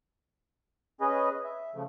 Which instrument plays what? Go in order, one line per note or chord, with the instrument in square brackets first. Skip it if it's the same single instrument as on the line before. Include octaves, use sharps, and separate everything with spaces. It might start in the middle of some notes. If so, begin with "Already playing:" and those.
[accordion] C#4 G#4 B4 D#5
E5
C#3 F3 A3